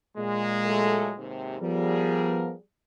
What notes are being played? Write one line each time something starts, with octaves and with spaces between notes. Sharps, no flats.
A#2 G#3
F#3 A3 A4
D#2 G#2 C3
F3 G3 B3 G#4 A#4